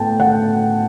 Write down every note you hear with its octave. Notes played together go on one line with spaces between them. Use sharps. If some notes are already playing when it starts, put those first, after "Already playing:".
Already playing: A2 B3 G5 A5
F#5